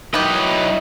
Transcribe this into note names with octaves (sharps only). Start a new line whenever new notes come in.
D#3 F#3 E4 G4 B4 D#5